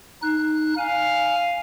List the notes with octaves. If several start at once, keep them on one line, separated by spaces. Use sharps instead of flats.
D#4 F#6
F5 G#5